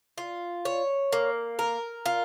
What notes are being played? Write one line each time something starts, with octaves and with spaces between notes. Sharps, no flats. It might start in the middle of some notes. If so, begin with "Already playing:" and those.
F4
C#5
A#3
A#4
F4